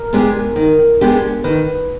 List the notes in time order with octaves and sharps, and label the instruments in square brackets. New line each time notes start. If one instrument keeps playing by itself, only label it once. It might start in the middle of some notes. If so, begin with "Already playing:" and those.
Already playing: [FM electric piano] A#4
[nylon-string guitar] G#3 B3 D4 G4
D#3
G#3 B3 D4 G4
[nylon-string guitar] D#3 [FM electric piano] B4